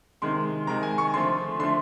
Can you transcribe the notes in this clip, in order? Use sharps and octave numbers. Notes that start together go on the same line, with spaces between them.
C3 D#3 G#3 C6
C3 D#3 G#3 A#5
G#5
C#6
D3 F3 A3 C6
D3 F3 A3 C6